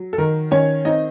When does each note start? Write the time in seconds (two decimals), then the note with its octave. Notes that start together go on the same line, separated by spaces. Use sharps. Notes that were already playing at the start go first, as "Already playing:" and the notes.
Already playing: F#3
0.13 A4
0.18 D#3 A#4
0.51 D#3 C#4 C#5
0.85 C4 D#4 D#5